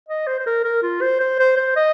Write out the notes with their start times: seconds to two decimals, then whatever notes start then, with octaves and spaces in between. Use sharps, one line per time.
0.09 D#5
0.27 C5
0.40 C5
0.46 A#4
0.65 A#4
0.83 F4
1.02 C5
1.20 C5
1.39 C5
1.57 C5
1.76 D#5